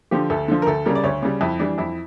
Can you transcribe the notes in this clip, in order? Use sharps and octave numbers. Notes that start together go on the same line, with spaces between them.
D3 F3 G4
D2 A4
D3 F3
A#4
D2 A4
C#3 G3 A#4
D5
D2 C#5
C#3 G3
F2 E4
E3 G3 D4
F2 E4